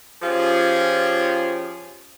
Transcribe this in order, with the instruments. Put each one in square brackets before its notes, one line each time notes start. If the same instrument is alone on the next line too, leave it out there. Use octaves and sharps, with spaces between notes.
[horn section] F3 C#4 F4 G4 G#4